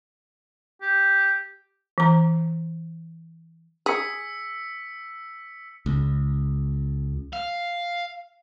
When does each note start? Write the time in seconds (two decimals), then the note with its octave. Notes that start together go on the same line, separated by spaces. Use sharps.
0.82 G4
1.98 E3 A#5
3.86 G#4 E6 B6 C#7
5.86 C#2
7.33 F5